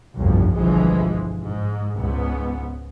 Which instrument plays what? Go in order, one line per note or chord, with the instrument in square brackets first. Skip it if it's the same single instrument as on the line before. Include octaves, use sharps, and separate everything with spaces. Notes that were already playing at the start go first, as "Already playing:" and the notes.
[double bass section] F1 B1 E2 G2 F3
G1 E3 F3 G#3
G#2
C#2 G#2 B3